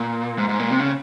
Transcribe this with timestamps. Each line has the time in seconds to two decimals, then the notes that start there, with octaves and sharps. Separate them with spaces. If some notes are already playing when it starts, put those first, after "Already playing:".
Already playing: A#2
0.38 G#2
0.49 G#2
0.59 A#2
0.70 C3
0.80 C#3